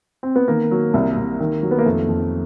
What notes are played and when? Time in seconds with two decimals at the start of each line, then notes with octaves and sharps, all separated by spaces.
0.23 C4
0.36 B3
0.48 D#3 A#3
0.71 F#3
0.94 C2
1.17 C2
1.40 D#3
1.62 F#3
1.71 B3
1.79 A#3
1.86 F2 A3
2.08 F2